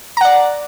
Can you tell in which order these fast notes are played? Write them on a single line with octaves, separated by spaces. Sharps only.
A#5 F#5 D5